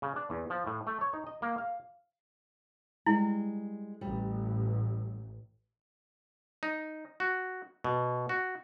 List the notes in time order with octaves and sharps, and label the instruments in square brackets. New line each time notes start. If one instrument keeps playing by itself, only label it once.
[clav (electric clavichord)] C#3
D4
E2
F3
A2
A3
C#5
D#4
D#5
A#3
F5
[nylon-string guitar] G3 G#3 [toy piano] E4
[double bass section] A1 [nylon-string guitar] G3
[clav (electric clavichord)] D#4
F#4
B2
F#4